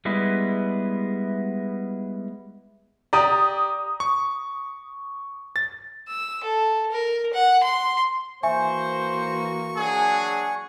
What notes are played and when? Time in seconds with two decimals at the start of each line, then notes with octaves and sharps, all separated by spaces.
0.05 G3 G#3 B3 E4
3.13 G4 D5 A#5 D#6
4.00 C#6
5.56 A6
6.08 E6
6.44 A4
6.91 A#4
7.34 F#5
7.63 C6
8.43 E3 A#3 F#4 C5 E5 G#5 C#6
9.77 F#3 D4 G#4